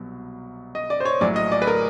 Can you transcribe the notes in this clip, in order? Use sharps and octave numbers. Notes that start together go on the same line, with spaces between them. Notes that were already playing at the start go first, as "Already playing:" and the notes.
Already playing: C2 B2 F#3
D#5
D5
C5
C#5
A#1 A2 F#3 D5
D#5
D5
B4
A#4